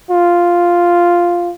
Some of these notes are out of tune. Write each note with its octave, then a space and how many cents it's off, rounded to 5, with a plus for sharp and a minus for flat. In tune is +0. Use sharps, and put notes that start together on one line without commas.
F4 +0